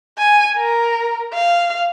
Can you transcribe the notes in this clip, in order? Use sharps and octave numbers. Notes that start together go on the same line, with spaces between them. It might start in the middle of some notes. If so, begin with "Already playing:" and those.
G#5
A#4
F5